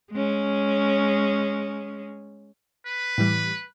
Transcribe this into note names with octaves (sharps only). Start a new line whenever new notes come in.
G#3 C#4
B4
A2 E3 G3